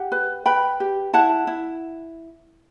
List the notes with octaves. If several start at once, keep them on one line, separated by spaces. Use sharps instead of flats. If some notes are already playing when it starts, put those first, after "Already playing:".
Already playing: G4 F#5
B4
B4 G5 B5
G4
E4 F#5 A5
E4